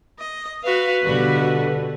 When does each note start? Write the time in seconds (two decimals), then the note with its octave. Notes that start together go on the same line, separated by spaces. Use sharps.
0.19 D#5
0.64 F#4 B4 F5
1.04 B2 D3 G3 F#4